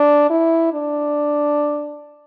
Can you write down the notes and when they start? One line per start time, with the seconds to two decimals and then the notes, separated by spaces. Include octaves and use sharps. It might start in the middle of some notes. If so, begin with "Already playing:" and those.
Already playing: D4
0.30 E4
0.73 D4